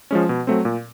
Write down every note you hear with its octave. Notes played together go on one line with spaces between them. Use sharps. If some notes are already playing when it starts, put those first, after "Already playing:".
F3 G#3 C#4
B2
F#3 A3 C4
A#2